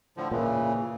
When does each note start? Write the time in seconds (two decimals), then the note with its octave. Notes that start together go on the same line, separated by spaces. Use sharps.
0.17 A2 D3 F3
0.31 A#2 C#3 E3